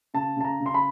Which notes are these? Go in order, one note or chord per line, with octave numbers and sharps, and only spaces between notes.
C#3 A5
C#3 A5
A#5
C#3
C6
B5